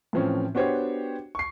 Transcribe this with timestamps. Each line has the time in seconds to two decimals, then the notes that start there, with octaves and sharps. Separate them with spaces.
0.13 A2 E3 F3 C4 C#4
0.55 B3 D4 F#4 G4 C5 C#5
1.35 C#6 C7